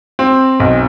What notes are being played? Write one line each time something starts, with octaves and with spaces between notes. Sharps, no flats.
C4
B1